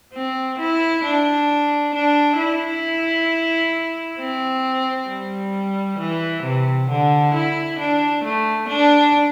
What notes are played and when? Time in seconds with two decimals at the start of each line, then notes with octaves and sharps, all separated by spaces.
0.14 C4
0.59 E4
1.05 D4
1.94 D4
2.39 E4
4.20 C4
5.09 G3
5.99 E3
6.44 C3
6.89 D3
7.34 E4
7.79 D4
8.24 A3
8.69 D4